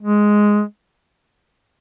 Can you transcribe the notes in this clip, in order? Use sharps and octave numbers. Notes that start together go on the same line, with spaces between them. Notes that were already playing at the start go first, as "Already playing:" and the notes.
G#3